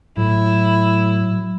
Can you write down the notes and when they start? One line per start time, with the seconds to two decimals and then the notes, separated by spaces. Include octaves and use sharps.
0.17 A2 F#3 E4